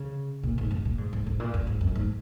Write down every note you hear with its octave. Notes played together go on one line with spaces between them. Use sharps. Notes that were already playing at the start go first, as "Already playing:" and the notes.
Already playing: C#3
A#2
G#2
F#2
A#2
G#2
G#2
G#2
A#2
F#2
G#2
F#2
G#2